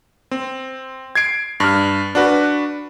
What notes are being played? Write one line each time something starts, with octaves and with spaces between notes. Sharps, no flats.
C4
G#6 C7 D7
G2 F6
D4 F#4 B4